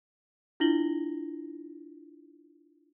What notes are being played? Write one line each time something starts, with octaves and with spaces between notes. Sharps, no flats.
D4 E4 F4 A#6 F#7 G7